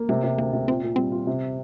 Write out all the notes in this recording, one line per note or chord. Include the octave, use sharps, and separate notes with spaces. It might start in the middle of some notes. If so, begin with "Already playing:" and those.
Already playing: A#3
C3 G#3
C3
D2 A#3
C3
A#2 C4
A#2
G3 C4
F4
C3